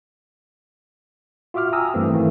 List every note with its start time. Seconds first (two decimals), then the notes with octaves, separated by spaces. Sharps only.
1.54 F4 F#4 E5 D6 F6
1.73 G5 G#5 A#5 D#6 E6
1.94 G2 E3 G3 A3 A#3 C4
2.13 D#3 E3 A3 A#3